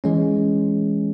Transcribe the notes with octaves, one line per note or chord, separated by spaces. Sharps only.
E3 G#3 C#4